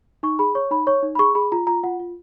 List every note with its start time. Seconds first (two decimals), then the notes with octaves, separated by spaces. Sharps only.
0.23 D#4 C#6
0.39 G#4 B5
0.55 C#5 C#6
0.71 D#4 B5
0.87 C#5 C#6
1.03 D#4
1.15 B5
1.19 G#4 C#6
1.35 G#4 B5
1.52 F4 A#5
1.67 F4 A#5
1.83 F4 F#5
2.00 F4